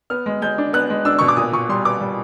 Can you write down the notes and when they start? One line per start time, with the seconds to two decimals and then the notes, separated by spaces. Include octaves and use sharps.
0.10 B3 F6
0.26 G#3
0.42 G#3 G6
0.58 D4
0.73 B3 F#6
0.90 G#3
1.05 D4 E6
1.19 B2 C#6
1.28 D6
1.37 A#2 D#6
1.53 A#2 C#6
1.69 G3 C6
1.85 B3 D6
2.01 G3